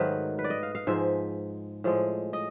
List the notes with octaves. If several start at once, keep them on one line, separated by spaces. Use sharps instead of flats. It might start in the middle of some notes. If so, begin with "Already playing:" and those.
Already playing: G#2 D#3 F#3 A3 B4
B4
D5
D#5
F5
F5
G#2 F3 G#3 E5
A2 F3 G#3
D#5